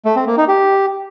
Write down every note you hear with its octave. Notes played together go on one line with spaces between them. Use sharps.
A3
C4
A#3
D#4
G4